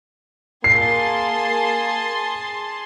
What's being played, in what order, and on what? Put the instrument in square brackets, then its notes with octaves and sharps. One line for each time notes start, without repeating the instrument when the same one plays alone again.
[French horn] A#3 [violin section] G#4 A5 C6 [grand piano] C7